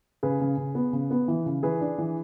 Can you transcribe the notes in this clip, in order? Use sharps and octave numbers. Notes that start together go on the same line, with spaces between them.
C#3 G#4 B4
C#3
C#3
B3
C#3
B3
E3
C#3
E3 G#4 B4
D4
E3